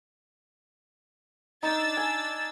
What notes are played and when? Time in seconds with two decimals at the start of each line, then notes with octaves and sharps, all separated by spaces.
1.63 D4 D#4 E6 A6
1.97 G#5